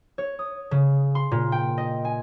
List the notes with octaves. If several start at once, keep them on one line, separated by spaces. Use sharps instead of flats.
C#5
D#6
C#3
C6
A#2
G5
D#5
G#5